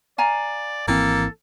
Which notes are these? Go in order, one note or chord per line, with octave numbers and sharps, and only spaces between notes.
D5 F5 G#5 A#5
G#1 E3 A#3 C4 A4